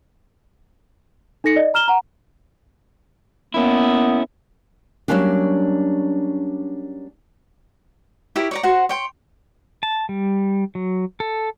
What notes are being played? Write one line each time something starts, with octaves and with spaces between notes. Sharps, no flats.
D#4 A4 A#6 C#7
D5 D#5
A#5 F6 E7 G7
F#5 A#5
A#3 B3 C#4 E4
F#3 G3 A3 A#3 C#4 D4
E4 G4 A#4 C#5
C#5 D5 A#5
F#4 C5 F#5
C#5 G5 C6
A5
G3
F#3
A4